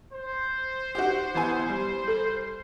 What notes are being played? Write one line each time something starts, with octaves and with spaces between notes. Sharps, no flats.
C5
F#4 G4
E3 B3 G#5
G3
A4